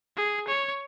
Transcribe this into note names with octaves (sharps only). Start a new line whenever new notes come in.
G#4
C#5